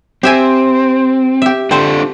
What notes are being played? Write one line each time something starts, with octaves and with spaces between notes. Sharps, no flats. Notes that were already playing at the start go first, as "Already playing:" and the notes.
C4 G4 E5 G#5
G4 E5
C4 D4 F4 A4 C5